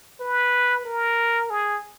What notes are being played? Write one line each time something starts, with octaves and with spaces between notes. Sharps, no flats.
B4
A#4
G#4